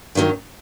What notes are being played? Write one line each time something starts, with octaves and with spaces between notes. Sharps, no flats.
G2 D#3 F#3